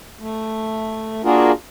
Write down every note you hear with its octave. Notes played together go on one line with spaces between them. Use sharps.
A3
A#3 D4 F4 F#4 G#4 A#4